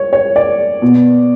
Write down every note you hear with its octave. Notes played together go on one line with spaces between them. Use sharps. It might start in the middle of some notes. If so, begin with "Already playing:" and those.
Already playing: C#5
C#5
D5
B2